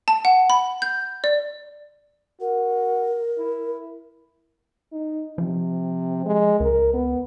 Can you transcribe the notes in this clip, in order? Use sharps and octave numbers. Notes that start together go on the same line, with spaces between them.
A5
F#5
B5
G6
D5
F#4 A#4
E4
D#4
C3 F3
G#3
C#2 A#4
B3